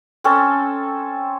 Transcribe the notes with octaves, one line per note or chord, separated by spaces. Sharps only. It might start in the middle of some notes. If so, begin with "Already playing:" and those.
C4 C#4 A4